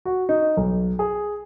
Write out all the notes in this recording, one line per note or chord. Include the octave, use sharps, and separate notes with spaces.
F#4
D#4
B1
G#4